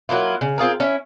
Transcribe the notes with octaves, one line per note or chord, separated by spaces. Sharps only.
F#3 A#3 E4 F4
C#3
C4 F4 G#4 A#4
C#4 E4